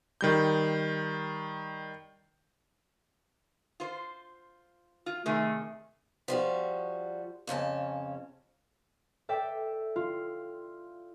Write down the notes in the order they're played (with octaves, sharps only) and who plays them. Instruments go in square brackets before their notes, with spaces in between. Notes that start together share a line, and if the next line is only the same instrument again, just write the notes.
[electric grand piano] D#3 G3 G6
[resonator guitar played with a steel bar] F4 C5
F4
[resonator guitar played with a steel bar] C3 D#3 G#4 [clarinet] A3
[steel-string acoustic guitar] F3 G3 F#4
F2 C#3 C#4 A5
[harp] A4 D5 E5 G5
F4